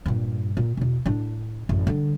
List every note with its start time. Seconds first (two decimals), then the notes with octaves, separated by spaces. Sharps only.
0.06 G2 A#2
0.57 A#2
0.77 E2 B2
1.06 A2 D4
1.69 A1 F#2
1.87 D3 G3